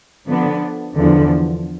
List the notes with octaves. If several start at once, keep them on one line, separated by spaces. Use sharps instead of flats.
D3 F3 B3 D4
E2 D3 F3